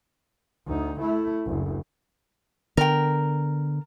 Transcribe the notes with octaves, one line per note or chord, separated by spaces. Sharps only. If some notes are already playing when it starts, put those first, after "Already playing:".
D2 D#4
A3 E4
F#1 D2
D3 B3 A#4 G5